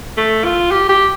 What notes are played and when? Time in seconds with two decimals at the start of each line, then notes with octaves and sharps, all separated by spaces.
0.17 A3
0.44 F4
0.71 G4
0.89 G4